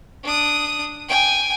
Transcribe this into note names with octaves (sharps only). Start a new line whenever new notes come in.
D4 D#6
G5 G#5